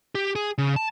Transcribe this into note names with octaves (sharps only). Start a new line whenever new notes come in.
G4
G#4
C#3
A5